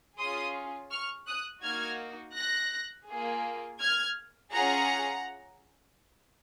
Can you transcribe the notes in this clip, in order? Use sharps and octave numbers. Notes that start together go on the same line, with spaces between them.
C#4 F4 G#4 C6 D#6
C#6 F6
D#6 F#6
A#3 D#4 F#4 F6 G#6
F#6 A#6
A#3 F4 G#4
F6 G#6
C#4 F4 G#4 F#5 A#5